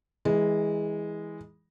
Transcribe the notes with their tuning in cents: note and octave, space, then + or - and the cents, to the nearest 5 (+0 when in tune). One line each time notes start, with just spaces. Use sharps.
E3 -20 G#3 -10